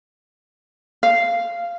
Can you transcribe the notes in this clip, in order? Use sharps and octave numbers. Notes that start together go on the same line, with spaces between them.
F5